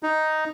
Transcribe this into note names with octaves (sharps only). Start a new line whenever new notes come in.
D#4